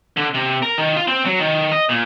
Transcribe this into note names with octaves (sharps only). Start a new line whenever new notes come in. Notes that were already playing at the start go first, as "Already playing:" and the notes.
D3
C3
A#4
D#3
F4
C4
F#3
D#3
D#5
A#2